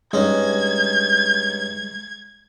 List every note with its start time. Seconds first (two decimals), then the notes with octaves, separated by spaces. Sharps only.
0.13 G2 G#3 C#4 D#4 G#6